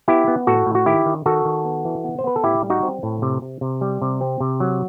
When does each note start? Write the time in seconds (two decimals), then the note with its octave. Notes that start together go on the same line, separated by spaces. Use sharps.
0.08 B3 E4 G4
0.28 B3
0.47 A2 F#4 A4
0.66 A2
0.75 F#4
0.86 D#3 E4 G4
1.06 D#3
1.26 D#3 F#4 A4
1.45 D#3
1.65 B3
1.85 E3
2.04 B3
2.19 C5
2.24 B3 B4
2.36 A4
2.44 A2 E4 G4
2.63 G3
2.70 D#4 F#4
2.83 C4
3.03 A2
3.22 C3
3.42 C3
3.61 C3
3.81 G3
4.02 C3
4.21 C4
4.40 C3
4.60 F#3